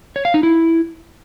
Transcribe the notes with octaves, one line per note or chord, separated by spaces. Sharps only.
C#5
F5
D#4
E4